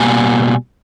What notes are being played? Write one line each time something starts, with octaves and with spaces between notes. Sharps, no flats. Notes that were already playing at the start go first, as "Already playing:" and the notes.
Already playing: B2 G3 A#3 G#5